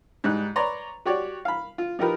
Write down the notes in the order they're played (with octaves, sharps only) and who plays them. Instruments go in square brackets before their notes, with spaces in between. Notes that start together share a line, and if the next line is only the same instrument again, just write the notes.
[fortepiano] G#2 G3 D#4 F#6
B4 C#5 D5 A#5 C6
F#4 G4 C#5 D5
F5 B5
F4
F3 D#4 G4 A#4 B4